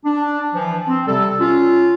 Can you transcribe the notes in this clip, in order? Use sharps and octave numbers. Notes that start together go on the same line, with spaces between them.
D4
E3 F3
C4
C3 G3 A4
C#4 F4